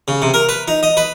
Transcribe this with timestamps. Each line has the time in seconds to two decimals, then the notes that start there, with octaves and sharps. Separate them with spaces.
0.08 C#3
0.22 C3
0.34 A#4
0.49 B4
0.68 D#4
0.83 D#5
0.97 B4